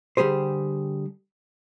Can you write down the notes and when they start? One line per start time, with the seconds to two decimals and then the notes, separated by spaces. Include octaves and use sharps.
0.17 D3 G3 G4 G#4 C5